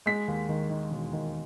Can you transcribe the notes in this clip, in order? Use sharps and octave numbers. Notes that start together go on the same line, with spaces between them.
G#3 B6
D#2
D#3
D#3
E1
D#3